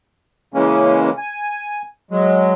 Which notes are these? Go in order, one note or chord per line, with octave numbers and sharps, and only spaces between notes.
C#3 E3 G#3 A#3 C#4
G#5
F#3 G#3